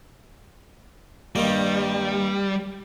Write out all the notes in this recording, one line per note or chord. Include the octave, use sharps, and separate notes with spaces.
G2 D#3 G3 A#3